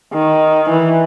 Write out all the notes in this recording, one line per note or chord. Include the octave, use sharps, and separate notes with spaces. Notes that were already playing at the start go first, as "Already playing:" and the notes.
D#3
E3